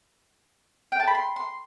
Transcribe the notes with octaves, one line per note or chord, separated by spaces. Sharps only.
G5
A5
B5
C6
C6